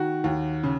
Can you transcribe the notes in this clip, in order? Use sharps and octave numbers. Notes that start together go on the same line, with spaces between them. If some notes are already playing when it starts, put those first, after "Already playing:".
Already playing: D#3 F#4
D#2
C#3